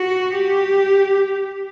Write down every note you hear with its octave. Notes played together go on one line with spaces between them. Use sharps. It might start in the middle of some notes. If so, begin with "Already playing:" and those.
Already playing: F#4
G4